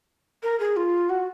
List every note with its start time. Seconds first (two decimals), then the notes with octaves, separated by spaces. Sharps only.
0.43 A#4
0.60 G#4
0.76 F4
1.09 F#4